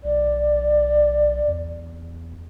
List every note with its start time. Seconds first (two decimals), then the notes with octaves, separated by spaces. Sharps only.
0.04 B1 D5
1.48 E2